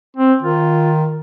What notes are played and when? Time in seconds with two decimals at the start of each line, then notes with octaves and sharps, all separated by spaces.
0.17 C4
0.42 D#3 F4